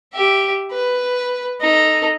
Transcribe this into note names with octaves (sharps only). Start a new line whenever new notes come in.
G4 E5
B4
D#4 A4